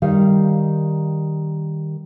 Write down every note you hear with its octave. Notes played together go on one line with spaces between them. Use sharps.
D#3 G3 F5